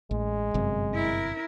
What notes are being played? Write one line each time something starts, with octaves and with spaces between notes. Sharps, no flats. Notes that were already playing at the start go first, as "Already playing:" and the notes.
A1 G#3
G1 F#2 C3
E4 A#4